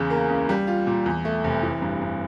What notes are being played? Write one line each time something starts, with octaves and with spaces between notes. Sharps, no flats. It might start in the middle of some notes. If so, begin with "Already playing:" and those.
Already playing: E2 C#3
A#3
C#2
G3
F4
A#2
E2
A3
F1
E3
G2
G2